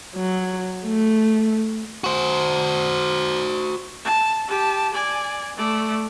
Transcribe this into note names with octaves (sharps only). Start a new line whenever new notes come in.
F#3
A3
F#4 C5
A5
G4 A5
D5 G#5
A3 D5